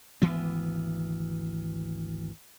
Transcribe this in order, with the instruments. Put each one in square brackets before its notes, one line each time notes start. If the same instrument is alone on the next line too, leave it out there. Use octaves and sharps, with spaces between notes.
[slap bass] G#1 D2 E3 B3